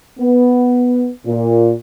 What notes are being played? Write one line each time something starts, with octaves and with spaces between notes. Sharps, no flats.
B3
A#2